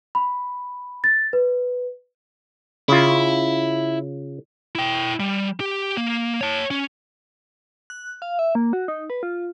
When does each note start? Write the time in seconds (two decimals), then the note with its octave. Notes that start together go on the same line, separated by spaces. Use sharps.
0.15 B5
1.04 A6
1.33 B4
2.88 C#3 E4 F4
4.75 E4 G5
5.20 G3
5.60 G4
5.97 A#3
6.41 C#5 A5
6.71 C#4
7.90 F#6
8.22 F5
8.39 E5
8.55 A#3
8.73 F#4
8.88 D#4
9.10 B4
9.23 F4